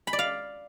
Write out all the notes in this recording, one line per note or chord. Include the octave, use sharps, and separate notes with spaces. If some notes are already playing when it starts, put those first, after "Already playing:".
B5
D5
F5